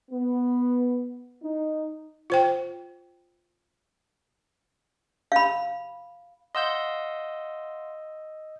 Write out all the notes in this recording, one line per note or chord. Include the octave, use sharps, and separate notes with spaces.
B3
D#4
F4 C5 G5
F5 B5
D#5 F5 F#5 C6 E6 G6